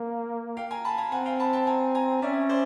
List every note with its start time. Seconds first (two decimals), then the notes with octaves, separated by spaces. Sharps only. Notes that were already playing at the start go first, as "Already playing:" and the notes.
Already playing: A#3
0.57 F5 G5
0.71 G#5 A#5
0.85 A5 B5
0.98 G#5 A#5
1.12 C4 F#5 G#5
1.26 F5 G5
1.40 A5 B5
1.53 G5 A5
1.67 G#5 A#5
1.95 G#5 A#5
2.22 C#4 D5 E5
2.49 C5 D5